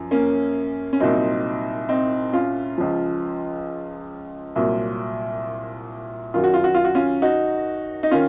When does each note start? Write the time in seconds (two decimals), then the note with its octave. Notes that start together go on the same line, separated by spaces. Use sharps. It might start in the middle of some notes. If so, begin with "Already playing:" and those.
Already playing: F#2 F3
0.11 A#3 C#4
0.93 C#4
1.00 C2 A#2 F#3 C4 D#4
1.89 C4 D#4
2.33 C#4 F4
2.78 C#2 C#3 F3
4.56 C2 A#2 F#3
6.34 F#2 D#3 F#3 F4
6.44 F#4
6.54 F4
6.64 F#4
6.75 F4
6.85 F#4
6.95 C#4 F4
7.22 D#4 F#4
8.03 D#4
8.11 D#3 C#4 F4